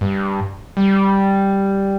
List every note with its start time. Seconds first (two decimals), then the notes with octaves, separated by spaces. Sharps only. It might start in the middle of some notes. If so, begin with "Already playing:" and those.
0.01 G2
0.77 G3